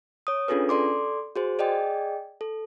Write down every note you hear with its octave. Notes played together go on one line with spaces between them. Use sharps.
C#5 D#6
C#4 D4 F4 G#4 A4 B4
A4 D5 C6 D6
F#4 G#4 C5
G#4 D5 D#5 G5
A4